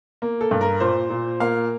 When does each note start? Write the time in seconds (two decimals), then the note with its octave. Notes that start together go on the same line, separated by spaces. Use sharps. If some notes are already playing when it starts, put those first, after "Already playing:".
0.22 A#3
0.41 A4
0.51 G2
0.61 A#4
0.80 A#2 C5
1.10 A#2
1.40 A#3 F5